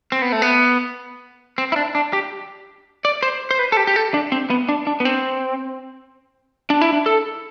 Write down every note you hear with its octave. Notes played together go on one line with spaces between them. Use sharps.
C4
B3
A3
B3
C4
E4
D4
D4
G4
D5
C5
C5
B4
A4
G4
G4
A4
D4
C4
B3
D4
D4
B3
C4
D4
E4
D4
A4